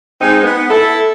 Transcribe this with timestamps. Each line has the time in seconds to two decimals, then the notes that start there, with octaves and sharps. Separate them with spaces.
0.21 G#3 C4 D#4
0.43 B3
0.71 E4 A4